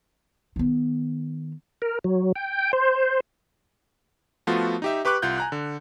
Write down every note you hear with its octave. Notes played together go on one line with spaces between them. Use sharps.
D#3 B3
A#4
F#3
G5
C5
F3 A3 B3 F4 F#4
D#4 G4 E5
G4 B4 C#6 D6 F#6
C2 F4 F#5 G6
G#5 A#5 F#6
D3